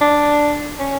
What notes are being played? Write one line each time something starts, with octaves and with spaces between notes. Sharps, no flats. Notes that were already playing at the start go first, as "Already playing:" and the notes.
D4
C#4